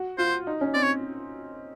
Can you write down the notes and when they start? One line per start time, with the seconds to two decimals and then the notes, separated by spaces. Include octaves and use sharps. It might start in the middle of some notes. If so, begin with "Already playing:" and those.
Already playing: F#4
0.18 F4 C5
0.47 D#4
0.61 C#4
0.74 C4 D5
0.83 C#5